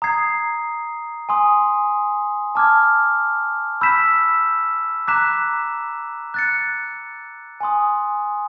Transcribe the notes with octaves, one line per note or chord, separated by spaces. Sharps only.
A#5 D#6 G#6 C7
G#5 C6 D#6
A5 D6 F6 G#6
B5 E6 G6 B6 E7
A#5 D6 F#6 B6 E7
F#6 A6 C#7
G#5 C6 D#6